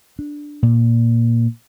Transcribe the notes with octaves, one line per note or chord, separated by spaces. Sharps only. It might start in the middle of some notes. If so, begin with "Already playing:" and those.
D4
A#2